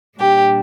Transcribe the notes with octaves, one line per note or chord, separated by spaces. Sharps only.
A#2 G3 D4 G4